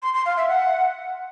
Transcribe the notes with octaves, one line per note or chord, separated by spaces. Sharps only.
C6
C6
F5
E5
F#5